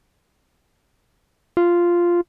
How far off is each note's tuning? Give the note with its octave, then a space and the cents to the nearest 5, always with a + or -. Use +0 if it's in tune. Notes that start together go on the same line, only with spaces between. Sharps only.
F4 -5